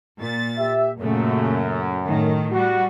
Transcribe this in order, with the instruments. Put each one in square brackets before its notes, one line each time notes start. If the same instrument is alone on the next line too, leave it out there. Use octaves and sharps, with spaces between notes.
[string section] A#2 A6
[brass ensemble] G4 E5
[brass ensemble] F#2 [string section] A#2 C#3 A3
[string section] A2 D#3
[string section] G3 [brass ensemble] F#4